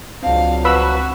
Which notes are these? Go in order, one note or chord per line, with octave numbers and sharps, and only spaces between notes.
C#2 F3 F#3 C4 D4 F5
F#4 B4 B5 E6